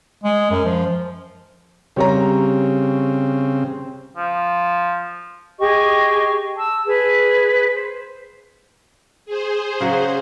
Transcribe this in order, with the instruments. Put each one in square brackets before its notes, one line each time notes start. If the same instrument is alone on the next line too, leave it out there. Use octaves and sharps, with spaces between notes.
[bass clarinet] G#3
F#2
F3
[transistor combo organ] C#3 C4 [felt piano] G3 C#5 A#5
[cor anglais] F3
[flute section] G4 G#4 D#5 C#6
A5 E6
G#4 B4
C5
[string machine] G#4 C5
[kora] C#3 F#3 F#5